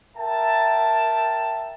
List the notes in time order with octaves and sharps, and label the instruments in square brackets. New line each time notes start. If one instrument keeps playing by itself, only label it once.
[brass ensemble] A#4 E5 G5 A5